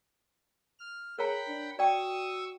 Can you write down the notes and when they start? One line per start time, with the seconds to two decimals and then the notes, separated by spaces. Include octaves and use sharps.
0.79 F6
1.19 G#4 A#4 C#5 F#5 G5 A#5 B5
1.48 D4
1.79 F#4 D5 G5 C#6 D#6 E6